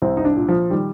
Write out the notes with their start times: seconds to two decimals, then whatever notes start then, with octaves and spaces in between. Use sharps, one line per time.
0.02 C2 C4
0.17 D#4
0.25 D4
0.37 A#2
0.49 F3
0.70 D#3 G3